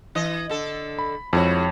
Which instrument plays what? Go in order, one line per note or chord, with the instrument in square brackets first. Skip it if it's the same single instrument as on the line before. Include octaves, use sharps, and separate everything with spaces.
[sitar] E3 D#5
D3 A4
[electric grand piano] B5
[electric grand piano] F2 C#5 [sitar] G#3 E4 F#4